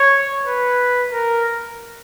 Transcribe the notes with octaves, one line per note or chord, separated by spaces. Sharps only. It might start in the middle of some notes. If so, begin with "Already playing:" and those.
Already playing: C#5
B4
A#4